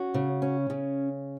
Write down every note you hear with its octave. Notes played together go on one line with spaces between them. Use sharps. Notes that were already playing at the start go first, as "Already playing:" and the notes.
Already playing: C#4 F#4
C#3
C#4
C#3